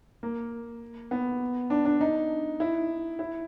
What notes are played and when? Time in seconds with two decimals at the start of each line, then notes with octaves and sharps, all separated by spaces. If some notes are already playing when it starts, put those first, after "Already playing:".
0.23 A#3
1.11 B3
1.70 D4
1.85 D4
2.01 D#4
2.60 E4
3.19 E4